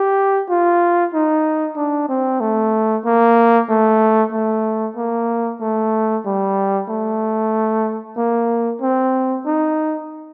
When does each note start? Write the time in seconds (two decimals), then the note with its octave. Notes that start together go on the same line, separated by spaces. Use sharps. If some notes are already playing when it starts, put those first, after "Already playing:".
Already playing: G4
0.49 F4
1.14 D#4
1.76 D4
2.09 C4
2.40 A3
3.05 A#3
3.69 A3
4.32 A3
4.97 A#3
5.60 A3
6.25 G3
6.89 A3
8.17 A#3
8.81 C4
9.45 D#4